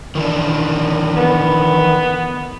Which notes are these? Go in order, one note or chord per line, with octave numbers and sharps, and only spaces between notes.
D#3 E3 D4
B3